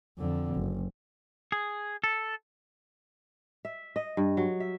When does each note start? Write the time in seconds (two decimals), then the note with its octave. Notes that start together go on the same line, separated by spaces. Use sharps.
0.18 F2 D3
0.56 F#1
1.52 G#4
2.04 A4
3.65 E5
3.96 D#5
4.17 G2
4.37 F#3
4.60 E5